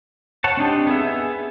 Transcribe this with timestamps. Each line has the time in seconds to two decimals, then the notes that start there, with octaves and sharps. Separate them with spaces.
0.44 C#5 F#5 A5
0.57 C4 D4 D#4 G4
0.87 B3 G#4 E5